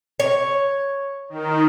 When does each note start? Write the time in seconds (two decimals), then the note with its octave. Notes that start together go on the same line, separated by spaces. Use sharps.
0.20 C#5
1.29 D#3